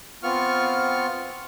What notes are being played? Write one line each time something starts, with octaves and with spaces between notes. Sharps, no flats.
B3 C4 F4 C#6 F6